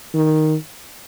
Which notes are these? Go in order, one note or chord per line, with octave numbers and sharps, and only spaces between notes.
D#3